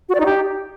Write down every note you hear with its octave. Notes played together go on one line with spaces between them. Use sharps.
F#4
D5
D#4
G4